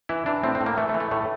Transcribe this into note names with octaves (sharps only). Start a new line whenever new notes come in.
E3 E4
E3 D4
A2 C4
C4
A2
A#3
E3 A3
A3
E3
A3
A2 A3